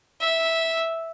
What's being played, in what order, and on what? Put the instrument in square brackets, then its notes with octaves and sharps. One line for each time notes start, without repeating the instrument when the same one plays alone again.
[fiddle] E5